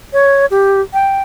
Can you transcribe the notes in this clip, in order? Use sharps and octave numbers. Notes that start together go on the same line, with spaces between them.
C#5
G4
G5